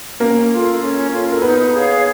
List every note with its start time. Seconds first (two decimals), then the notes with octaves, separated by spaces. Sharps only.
0.20 A#3 C#4 A#4
0.51 F4 A4
0.80 C#4
1.11 F4 A4
1.32 A#4
1.42 B3 D#4 B4
1.73 G#4 C#5 F5